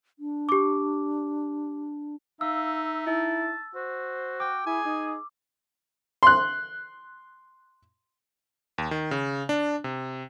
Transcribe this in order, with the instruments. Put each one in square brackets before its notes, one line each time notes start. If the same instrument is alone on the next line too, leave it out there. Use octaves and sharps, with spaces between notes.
[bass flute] D4
[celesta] G4 D6
[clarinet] D#4 [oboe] E5 [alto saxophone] F5 [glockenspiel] E6
[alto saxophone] E4 [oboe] A5
[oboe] F#4 [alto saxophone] C5
[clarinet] G5 [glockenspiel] D6
[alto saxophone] E4 [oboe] G#4 [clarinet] G#5
[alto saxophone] D#4
[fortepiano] C6 F#6
[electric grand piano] D#2
D#3
C#3
D4
C3